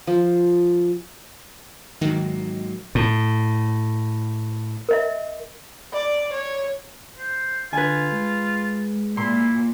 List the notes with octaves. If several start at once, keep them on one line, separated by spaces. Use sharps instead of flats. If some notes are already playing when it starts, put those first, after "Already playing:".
F3
G#2 D#3 F#3 A#3
A2
A#4 D#5 E5
D5
C#5
C5
D3 F4 B4 G#5
G#3
A#2 E4 C6